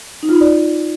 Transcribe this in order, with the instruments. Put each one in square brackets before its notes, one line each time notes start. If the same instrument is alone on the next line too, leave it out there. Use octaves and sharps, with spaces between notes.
[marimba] D#4
F4
D#4
D5